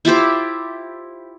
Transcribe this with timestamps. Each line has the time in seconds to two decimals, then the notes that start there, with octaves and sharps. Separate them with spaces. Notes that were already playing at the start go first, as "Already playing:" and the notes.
0.05 E4 F4 G4 C5